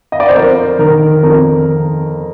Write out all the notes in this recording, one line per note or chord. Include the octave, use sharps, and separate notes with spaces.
D#5
D5
C5
F2 A#4
D#3 A#4
F2 A#4